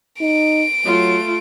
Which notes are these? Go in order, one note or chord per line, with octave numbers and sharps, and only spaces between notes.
D#4 D7
F#3 A3 F4